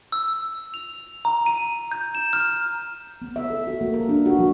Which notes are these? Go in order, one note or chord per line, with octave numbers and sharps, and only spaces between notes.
E6
F7
A#5
D#7
G6
E7
F6
B3
E5
A4
F#4
A#3
A#4
D4
F#4
F#3